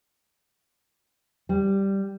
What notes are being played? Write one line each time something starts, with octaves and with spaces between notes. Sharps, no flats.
G3